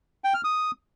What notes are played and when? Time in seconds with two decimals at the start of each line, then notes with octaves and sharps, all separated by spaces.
0.24 G5
0.34 F6
0.44 D#6